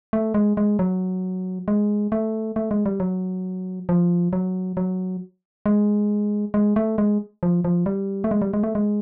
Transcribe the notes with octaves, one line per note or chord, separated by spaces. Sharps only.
A3
G#3
G#3
F#3
G#3
A3
A3
G#3
G3
F#3
F3
F#3
F#3
G#3
G#3
A3
G#3
F3
F3
G3
A3
G#3
G3
G#3
A3
G#3